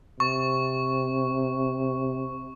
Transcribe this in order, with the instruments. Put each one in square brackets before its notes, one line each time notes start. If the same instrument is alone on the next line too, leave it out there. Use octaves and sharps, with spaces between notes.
[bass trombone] C3 [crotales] C#6